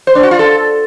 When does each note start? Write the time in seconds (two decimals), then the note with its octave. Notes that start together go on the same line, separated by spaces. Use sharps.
0.07 C5
0.15 D4
0.23 F#4
0.31 F4
0.39 A4